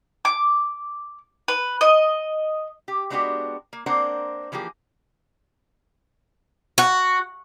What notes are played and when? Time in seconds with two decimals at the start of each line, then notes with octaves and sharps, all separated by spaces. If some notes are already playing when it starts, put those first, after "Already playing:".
0.25 D6
1.48 B4
1.81 D#5
2.88 G4
3.10 G#3 B3 D4 F#4 G4
3.73 A#3
3.86 A#3 C4 D4 A#4 C5 F#5
4.52 E3 F3 A#3 G4 G#4
6.78 F#4